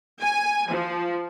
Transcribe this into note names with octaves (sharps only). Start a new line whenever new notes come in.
G#5
F3